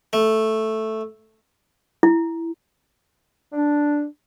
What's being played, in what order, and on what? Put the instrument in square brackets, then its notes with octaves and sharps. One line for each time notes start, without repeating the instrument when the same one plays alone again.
[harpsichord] A3
[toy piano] E4
[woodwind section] D4